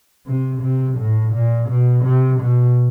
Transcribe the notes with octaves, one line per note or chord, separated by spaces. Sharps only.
C3
C3
A2
A#2
B2
C3
B2